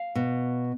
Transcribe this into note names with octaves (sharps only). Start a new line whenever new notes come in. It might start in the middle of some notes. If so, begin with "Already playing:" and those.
Already playing: F5
B2